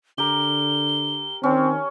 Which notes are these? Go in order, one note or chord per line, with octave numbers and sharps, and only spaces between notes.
D3 G4 A#4 G7
D#3 C4 C#4